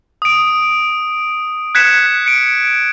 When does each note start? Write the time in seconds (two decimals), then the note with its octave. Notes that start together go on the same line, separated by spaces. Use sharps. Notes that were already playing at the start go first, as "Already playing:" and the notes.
0.22 D#6 D7
1.75 F#6 G#6 B6 C#7 E7
2.26 C#7 D7